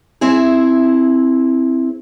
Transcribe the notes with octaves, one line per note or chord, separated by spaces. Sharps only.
C4 E4 G#4